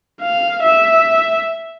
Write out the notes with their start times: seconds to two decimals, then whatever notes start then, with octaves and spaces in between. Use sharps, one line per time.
0.21 F5
0.63 E5